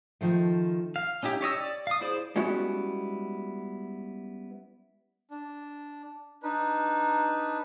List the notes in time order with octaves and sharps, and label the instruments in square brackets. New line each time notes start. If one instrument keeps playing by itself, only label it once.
[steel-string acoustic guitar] D#3 F3 A3
[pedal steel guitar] F5
C#4 D#4 E4 G4
G4 C#5 D#5 E6
D5
F5 D#6
E4 G#4 C5 D5
[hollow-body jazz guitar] G3 G#3 B3 C#4 E4 F#4
[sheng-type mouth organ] D4
D4 D#4 B4